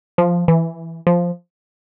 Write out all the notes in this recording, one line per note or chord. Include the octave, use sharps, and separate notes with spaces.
F3
E3
F3